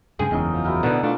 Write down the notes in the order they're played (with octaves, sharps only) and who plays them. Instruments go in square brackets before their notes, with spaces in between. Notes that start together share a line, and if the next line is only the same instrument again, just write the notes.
[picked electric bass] G2 C#3 G#3 [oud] G#4 [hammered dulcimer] G5
[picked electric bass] F#1 E2 [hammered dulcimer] G#3 C#4 D#4
[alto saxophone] F3
[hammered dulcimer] E4 F#4 A#4
[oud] B2 D#4 [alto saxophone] D3 [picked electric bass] B3
[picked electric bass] A3 [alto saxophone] D4 [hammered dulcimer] F4 D5